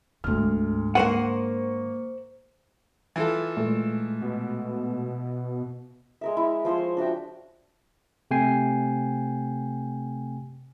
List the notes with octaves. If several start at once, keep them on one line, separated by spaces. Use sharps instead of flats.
D2 G#2 D3 F6
A#3 A#4 C5 F#5 C#6 D#7
E3 F4 A4
A#2 G#3 A3
B2
G#3 A#4 E5
E4
F3 C5 C#5 C6
C#6
D4 F#4 E5 G5
C3 A3 G5 G#5 C7